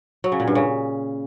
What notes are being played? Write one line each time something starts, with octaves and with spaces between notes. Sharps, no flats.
F#3
C#3
A#2
G2
C#3